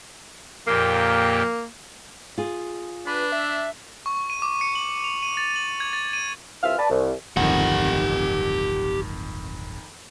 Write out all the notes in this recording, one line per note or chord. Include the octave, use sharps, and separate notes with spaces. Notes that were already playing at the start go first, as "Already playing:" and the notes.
F2 A#2 A#3 G4
F4 G#4
D4 B4
E5
C#6
D#7
D6
C#7
F#7
F7
D#7
A6
F#7
G#6
A6
D#7
C2 E3 C4 F4 E5 F6
B4 D5 A5
C2
D1 G1 F2 D#3 G4 F#5